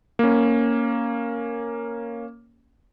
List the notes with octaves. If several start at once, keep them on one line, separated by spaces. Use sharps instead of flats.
A#3 C#4